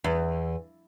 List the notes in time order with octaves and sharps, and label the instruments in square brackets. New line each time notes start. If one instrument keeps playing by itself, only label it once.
[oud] E2